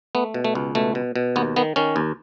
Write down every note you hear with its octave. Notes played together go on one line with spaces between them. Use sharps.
A3 B3
B2
A3
C#2
B2 A3
B2
B2
D#2 B3
D#3 B3
D#3 C#4
D#2